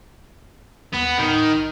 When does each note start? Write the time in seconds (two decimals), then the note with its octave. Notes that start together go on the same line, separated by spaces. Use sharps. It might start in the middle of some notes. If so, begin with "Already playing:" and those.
0.94 D#2 B3
1.19 A2 D#3
1.56 B1